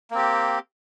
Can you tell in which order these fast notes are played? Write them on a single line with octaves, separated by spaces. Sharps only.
A#3 C4 G4